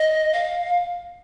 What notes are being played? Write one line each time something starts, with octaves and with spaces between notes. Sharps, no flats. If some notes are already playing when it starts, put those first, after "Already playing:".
Already playing: D#5
F5